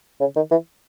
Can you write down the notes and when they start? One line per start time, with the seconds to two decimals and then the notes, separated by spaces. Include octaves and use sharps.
0.20 C#3
0.36 D#3
0.51 E3